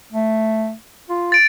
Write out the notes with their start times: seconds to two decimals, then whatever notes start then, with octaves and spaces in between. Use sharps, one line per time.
0.12 A3
1.10 F4
1.32 A6 D7